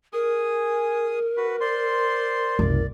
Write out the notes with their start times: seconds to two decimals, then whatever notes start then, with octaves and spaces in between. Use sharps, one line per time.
0.13 G#4 A#4 G#5 D#6
1.37 F#4 B4
1.61 C5 D5 C6
2.59 F#1 C2 D5